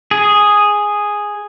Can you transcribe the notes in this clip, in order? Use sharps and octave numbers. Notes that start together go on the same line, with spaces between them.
G#4